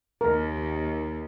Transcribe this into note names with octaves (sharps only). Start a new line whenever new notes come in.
D#2 A#4